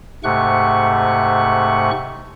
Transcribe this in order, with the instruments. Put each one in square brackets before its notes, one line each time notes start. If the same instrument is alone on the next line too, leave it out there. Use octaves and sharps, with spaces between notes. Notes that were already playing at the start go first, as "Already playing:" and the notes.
[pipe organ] G#2 C3 A3 F#5 C#6 F#6